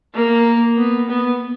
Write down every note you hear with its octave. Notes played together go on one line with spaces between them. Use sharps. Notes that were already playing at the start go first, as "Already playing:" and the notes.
A#3
B3
B3